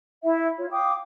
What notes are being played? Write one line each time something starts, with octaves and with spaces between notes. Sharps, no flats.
E4 E5
F4 C#5
F5 G5 D6 D#6